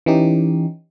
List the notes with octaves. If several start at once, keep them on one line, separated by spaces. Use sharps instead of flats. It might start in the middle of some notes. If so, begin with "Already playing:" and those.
E3 C#4 D#4 G4